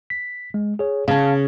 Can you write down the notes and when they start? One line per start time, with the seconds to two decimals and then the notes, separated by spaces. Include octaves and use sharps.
0.10 B6
0.54 G#3
0.79 G#4 C#5
1.08 C#3 C#4 F5 A5